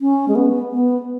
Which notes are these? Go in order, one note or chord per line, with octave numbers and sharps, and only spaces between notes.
C#4
G#3
B3
B3